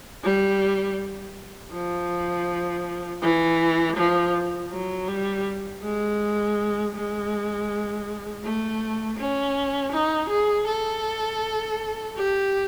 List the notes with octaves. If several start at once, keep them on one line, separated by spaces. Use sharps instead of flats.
G3
F3
E3
F3
F#3
G3
G#3
G#3
A3
C#4
D#4
G#4
A4
G4